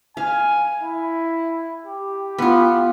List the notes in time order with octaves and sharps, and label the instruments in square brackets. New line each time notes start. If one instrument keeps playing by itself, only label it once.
[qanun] F5 [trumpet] G#5
[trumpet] E4
G4
[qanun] B3 F4